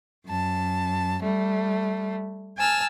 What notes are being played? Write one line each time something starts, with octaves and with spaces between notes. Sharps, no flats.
F#2 A5
G3 A3
G#5 A5 E6 F6